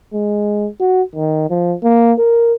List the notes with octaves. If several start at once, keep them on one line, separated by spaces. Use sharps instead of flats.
G#3
F#4
D#3
F3
A#3
A#4